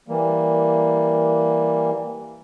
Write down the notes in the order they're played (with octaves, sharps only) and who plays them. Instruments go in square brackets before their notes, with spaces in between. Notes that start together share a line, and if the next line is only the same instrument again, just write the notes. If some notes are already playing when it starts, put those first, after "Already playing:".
[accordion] E3 G3 A#3